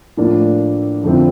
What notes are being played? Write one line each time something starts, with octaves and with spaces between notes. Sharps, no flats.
A2 F3 A#3 D4
F2 D3 F3 C4 E4